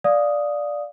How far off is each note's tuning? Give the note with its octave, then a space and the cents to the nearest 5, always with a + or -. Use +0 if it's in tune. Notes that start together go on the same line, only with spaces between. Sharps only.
D5 +0 F5 +15 D#6 +0